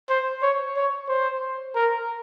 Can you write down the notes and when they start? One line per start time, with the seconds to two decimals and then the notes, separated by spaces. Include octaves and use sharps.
0.10 C5
0.42 C#5
0.77 C#5
1.09 C5
1.75 A#4